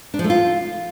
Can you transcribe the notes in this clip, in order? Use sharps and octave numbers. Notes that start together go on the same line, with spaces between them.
D4
F3
A3
F4